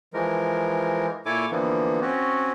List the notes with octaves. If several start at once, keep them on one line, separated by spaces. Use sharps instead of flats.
E3 F3 G#3 A#4
A#2 E4 A4 C#5 G#5 D6
D3 E3 F3 A#3 B3
C4 C#4 F#4